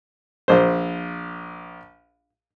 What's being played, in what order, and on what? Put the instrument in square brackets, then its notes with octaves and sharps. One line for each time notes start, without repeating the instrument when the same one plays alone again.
[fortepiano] A#1 C5